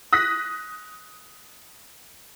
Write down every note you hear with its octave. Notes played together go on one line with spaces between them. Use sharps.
D#6 F#6 A#6 B6